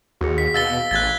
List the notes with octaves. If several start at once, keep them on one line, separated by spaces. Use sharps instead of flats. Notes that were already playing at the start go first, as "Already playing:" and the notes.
D#2 F#4 G#4
B6
B2 F5 E6 A6 G7
A1 F#6 G#6 A6